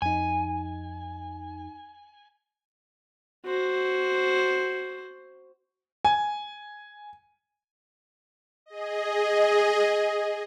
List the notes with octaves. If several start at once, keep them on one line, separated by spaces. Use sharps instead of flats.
F2 D#4 G#5
F#4 C5
G#5
G#4 D#5